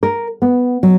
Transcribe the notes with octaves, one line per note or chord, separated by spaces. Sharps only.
A#4
B3
F#3